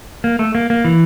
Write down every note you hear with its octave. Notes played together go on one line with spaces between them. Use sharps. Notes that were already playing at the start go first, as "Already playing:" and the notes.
A#3
A3
A#3
A#3
E3